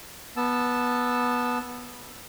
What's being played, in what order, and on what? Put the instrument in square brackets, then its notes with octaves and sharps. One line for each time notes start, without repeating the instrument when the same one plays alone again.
[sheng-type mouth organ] B3 A5 E6